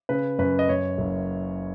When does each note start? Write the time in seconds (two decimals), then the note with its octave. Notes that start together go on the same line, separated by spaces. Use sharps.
0.09 C#3 B4
0.39 F#2 B4
0.59 D#5
0.69 F#2 C#5
0.98 F#1